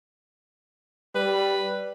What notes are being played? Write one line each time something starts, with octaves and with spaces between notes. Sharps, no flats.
G3 B4